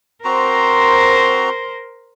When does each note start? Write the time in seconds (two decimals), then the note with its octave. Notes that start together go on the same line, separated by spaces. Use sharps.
0.24 C4 F#4 A#4 C5 A#5